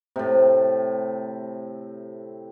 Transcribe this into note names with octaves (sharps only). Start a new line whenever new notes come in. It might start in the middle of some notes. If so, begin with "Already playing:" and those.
A2 C3